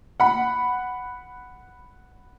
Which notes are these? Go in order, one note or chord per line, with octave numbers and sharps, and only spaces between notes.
F#5 B5